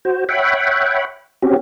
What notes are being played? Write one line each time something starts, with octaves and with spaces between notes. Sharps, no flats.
F#4 C5
C#5 E5 F#5 G5 B5
C4 C#4 F#4 G4